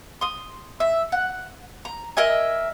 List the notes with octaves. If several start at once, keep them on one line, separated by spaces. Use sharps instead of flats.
C6 D#6
E5
F#5
A#5
A#4 D#5 E5 G#5